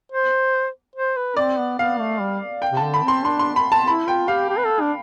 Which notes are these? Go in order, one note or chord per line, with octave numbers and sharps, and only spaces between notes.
C5
C5
B4
C4 D5
B3
B3 F5
A3
G3
G5
C3
A5
D3
B5
C4 C6
D4 C6
C6
B5
A5
E4 B5
F4 G5
G4 F5
G4
B4
A4
D4